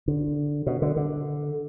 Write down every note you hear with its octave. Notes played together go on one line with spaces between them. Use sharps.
D3
B2
D3
D3